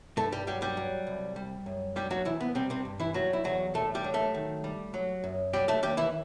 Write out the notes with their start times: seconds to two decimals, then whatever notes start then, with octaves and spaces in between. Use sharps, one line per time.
0.17 G2 A3 A4
0.32 G3 G4
0.47 F#3 G3 G4
0.62 G3 G4
0.77 F#3
1.07 C2
1.36 G3
1.66 F#2
1.96 F#3 G3 G4
2.11 F#3 F#4
2.25 C2 E3 E4
2.41 B3
2.55 C3 G3 C4
2.70 C3 C4
2.85 G2
3.00 E3 E4
3.14 F#3 G3 F#4
3.33 E4
3.44 E2 F#3 F#4
3.74 A2 A3 A4
3.95 G3 G4
4.04 F#3
4.14 A3 A4
4.34 D#3
4.64 G3
4.94 F#3
5.24 F#2
5.53 F#3 G3 G4
5.68 A3 A4
5.83 D#2 G3 G4
5.97 E3 E4